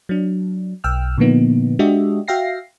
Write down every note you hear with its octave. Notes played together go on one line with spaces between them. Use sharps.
F#3 D4
B1 G5 E6 F6
A#2 D3 F3 A#3 B3 D#4
G#3 D4 F#4 G4 D#5 E5
F#4 E5 F5 G5 A#6 C7